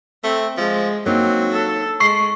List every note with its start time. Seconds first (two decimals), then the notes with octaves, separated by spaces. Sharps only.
0.24 A3 C4
0.57 F3 G#3
1.06 F#3 A#3 C4 D#4
1.51 A4
2.00 G#3 C#6 C7